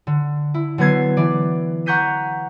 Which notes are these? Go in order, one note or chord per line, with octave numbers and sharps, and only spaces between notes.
D3
E4
D3 F#3 B3 B4 G#6 C7
E3 D5
F#5 A#5 C#6 G6 B6 D#7